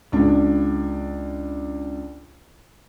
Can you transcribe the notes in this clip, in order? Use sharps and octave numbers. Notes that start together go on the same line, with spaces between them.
C#2 D4